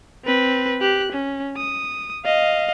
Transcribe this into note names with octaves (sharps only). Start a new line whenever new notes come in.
C4 B4
G4 F#6
C#4
D#6
D#5 F5